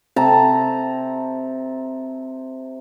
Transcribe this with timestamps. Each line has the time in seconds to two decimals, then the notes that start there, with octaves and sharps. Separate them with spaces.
0.16 C3 A5 A#5